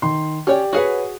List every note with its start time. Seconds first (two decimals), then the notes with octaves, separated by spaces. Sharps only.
0.02 D#3 C6
0.47 C#4 G4 C#5 D5 G5
0.73 F#4 G#4 B4 C#5 F#5